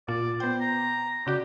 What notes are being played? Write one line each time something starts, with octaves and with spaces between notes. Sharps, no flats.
A#2 F4 D5
B3 C5 G5
A#5
C#3 F#4 G4 D5